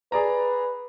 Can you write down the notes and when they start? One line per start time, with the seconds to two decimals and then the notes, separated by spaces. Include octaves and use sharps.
0.12 G#4 B4 D5 A#5